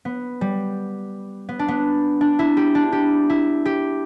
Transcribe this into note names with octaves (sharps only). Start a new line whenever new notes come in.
B3
G3
B3
D4
B3
D4
E4
G4
D4
G4
E4
G4